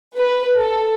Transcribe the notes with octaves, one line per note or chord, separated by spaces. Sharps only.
B4
A4